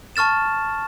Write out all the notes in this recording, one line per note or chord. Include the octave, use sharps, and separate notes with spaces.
A5 C#6 F6 A6 E7